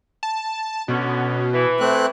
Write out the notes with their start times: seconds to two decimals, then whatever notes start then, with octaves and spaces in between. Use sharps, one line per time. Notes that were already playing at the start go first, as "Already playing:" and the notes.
0.23 A5
0.88 B2 D3 B3 C#4
1.52 E3
1.80 A3 C4 F#6